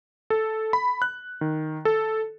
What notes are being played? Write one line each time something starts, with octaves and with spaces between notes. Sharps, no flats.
A4
B5
F#6
D#3
A4